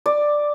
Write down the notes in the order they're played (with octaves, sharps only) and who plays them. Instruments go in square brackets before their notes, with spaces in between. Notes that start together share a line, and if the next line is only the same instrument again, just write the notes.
[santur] D5